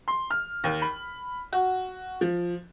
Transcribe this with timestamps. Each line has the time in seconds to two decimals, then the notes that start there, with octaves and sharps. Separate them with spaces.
0.08 C6
0.30 F6
0.64 D#2
0.82 B5
1.53 F#4
2.21 F3